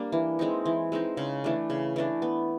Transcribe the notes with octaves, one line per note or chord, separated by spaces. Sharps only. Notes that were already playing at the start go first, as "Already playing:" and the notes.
Already playing: G3 A#3 D4
E3
G#3 C4 D#4
E3
G#3 C4 D#4
C#3
E3 A3 D4
C#3
E3 A3 D4
B3